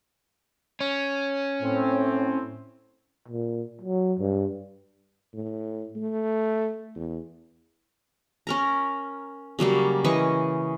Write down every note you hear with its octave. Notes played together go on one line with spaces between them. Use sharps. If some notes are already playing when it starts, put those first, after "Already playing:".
C#4
A2 C4
A#2
F#3
G2
A2
A3
E2
C#4 A#4 A#5
C#3 F#3 G3 A#3
E3 C#4 D#5 C#6